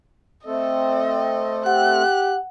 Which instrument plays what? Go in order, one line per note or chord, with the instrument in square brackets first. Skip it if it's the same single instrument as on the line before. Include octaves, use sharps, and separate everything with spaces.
[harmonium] A3 C4 A4 [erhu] D#5
[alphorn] G4 [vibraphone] F#5 [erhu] F#6